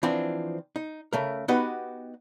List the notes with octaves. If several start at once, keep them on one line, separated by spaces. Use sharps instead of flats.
E3 F3 C4 D4
D#4
C#3 A3 A#4
B3 D#4 F#4 G4 B4 D#5